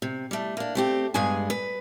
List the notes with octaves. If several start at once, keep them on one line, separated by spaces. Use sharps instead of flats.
C3
G3 A3
A#3 D4
A3 C4 G4
G2 G#3 B3 G#4 G#5
B4